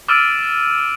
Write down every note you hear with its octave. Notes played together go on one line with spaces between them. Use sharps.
D6 E6 F6 A6 D7 D#7